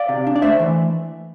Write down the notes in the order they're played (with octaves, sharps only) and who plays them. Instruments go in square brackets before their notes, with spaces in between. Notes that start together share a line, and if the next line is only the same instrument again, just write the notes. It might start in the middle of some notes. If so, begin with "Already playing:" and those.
Already playing: [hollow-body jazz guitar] D5 F5
C3
D4
D5
A3 C5 E5
E3